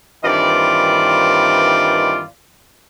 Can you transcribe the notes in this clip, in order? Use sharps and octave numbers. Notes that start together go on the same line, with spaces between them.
G2 D#3 E3 C4 F4 D5